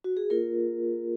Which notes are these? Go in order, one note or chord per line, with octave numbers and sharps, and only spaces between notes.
F#4
G#4
A#3 F4 A#4